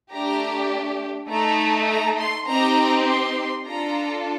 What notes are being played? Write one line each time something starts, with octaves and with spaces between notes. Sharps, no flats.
A3 D4 G4 A#5
A3 D#4 A4 A#5
A#5
C6
C4 D#4 G4 A#5
C6
D4 F4 A4 A#5